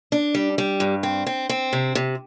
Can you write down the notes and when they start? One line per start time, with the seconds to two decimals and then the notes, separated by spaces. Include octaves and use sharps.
0.12 D4
0.35 G3
0.58 G3
0.80 G2
1.03 C4
1.26 C4
1.49 C4
1.73 C3
1.95 C3